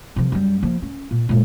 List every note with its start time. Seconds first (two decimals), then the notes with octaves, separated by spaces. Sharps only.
0.16 C3 F3
0.32 F#2 G3
0.63 F3 A#3
0.82 C#4
1.11 A#2
1.29 A#2 G#3